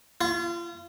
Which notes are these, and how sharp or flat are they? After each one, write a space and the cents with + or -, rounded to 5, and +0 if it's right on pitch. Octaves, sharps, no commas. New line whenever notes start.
F4 -35